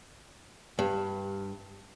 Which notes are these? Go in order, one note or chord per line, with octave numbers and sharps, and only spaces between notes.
G2